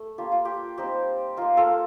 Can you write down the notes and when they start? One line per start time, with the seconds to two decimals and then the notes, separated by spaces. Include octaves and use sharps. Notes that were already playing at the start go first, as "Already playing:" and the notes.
Already playing: A3
0.18 A#3 D4 F4 G4
0.32 F4
0.45 G4
0.78 G3 C4 D#4 G4
1.37 A#3 D#4 F4
1.57 F4 A4